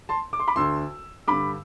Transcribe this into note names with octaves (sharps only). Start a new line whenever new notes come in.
A5 C6
D6
C6
B5 D6
D2 D3 C6 E6
G2 D3 B5 D6